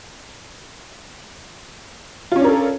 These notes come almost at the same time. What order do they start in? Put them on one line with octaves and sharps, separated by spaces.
F4 C#4 D4 A#4 A4